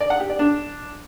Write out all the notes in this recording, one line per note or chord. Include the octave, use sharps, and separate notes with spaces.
D5
F#5
G4
D5
D4